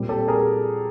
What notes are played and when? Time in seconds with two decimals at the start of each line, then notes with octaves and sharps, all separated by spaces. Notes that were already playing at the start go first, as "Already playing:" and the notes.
Already playing: A#2 G3 C4
0.09 G4 A4
0.28 G#4 A#4